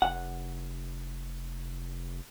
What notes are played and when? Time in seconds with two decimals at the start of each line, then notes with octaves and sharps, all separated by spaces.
0.02 F1 F#5